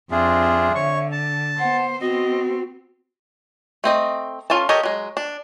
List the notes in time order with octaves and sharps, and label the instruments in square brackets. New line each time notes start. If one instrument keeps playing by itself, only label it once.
[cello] F2 C4 [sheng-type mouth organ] D4 F4 G#4 [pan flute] E5
[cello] D3 [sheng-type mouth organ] C#5 C#6
[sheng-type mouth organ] A5
[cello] B3 C5 [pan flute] F#5
[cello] B3 C4 [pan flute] F#4 [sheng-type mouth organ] D#5
[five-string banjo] A3 C4 D#5
C#4 F4 A4 A5
G4 A4 A#4 C#5 D#5
F#3 G#3
D4